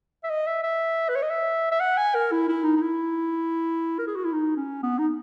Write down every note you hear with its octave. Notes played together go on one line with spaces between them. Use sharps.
E5
D#5
E5
E5
B4
C#5
D#5
E5
E5
F#5
G#5
A#4
E4
E4
D#4
D#4
E4
A#4
G#4
F#4
E4
D#4
C#4
B3
D#4